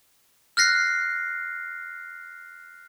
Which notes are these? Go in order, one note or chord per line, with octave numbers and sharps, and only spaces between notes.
F6 F#6 A#6 C7